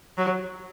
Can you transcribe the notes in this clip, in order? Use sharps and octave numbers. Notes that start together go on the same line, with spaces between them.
F#3